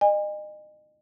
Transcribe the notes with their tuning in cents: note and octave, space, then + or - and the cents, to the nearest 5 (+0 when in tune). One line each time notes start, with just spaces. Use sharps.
D#5 -35 G#5 -35